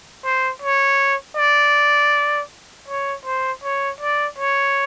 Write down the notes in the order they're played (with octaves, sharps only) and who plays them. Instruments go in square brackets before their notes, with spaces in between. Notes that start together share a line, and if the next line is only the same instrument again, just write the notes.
[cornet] C5
C#5
D5
C#5
C5
C#5
D5
C#5